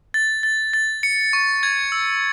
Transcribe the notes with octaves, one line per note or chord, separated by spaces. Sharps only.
A6
A6
A6
C#7
C#6
G#6
E6